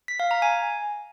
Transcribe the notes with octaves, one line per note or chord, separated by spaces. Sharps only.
B6
F5
A#5
G#5